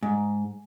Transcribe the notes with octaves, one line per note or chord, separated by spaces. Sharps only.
G#2